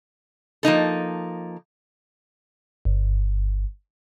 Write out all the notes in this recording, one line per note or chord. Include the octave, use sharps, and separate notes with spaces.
F3 A#3 D#4 A4
G1